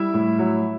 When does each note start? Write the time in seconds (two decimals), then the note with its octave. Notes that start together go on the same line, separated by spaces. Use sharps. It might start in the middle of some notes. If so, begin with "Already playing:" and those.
Already playing: G3 E4 E5
0.14 A2
0.39 F#3